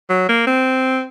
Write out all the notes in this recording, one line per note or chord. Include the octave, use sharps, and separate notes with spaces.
F#3
A#3
C4